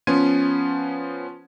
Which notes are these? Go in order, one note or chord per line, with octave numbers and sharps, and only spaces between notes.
F3 B3 C#4 C6 G#6 D#7